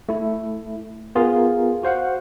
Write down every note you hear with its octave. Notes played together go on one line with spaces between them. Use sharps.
A3 E4
B3 F4 G#4 A#4
F#4 C5 F5 F#5